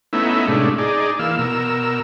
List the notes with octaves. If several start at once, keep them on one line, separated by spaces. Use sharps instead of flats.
A3 B3 C#4 D#4 E4 E5
A2 C3 G#3 A3 C#4 D4
D#4 G#4 D5
E3 A#3 F5 E6
B2 A#4 E6